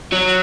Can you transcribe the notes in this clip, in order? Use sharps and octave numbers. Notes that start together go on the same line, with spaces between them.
F#3